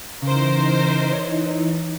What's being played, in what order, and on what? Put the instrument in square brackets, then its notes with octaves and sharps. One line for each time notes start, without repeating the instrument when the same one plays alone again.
[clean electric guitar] C#3 [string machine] E3 D#4 [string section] A#4 C5
[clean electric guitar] C#5